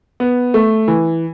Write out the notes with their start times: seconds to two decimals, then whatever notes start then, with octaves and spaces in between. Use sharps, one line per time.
0.20 B3
0.54 A3
0.88 E3